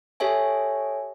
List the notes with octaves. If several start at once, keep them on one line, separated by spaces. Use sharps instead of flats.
G4 A4 C#5 E5 G#5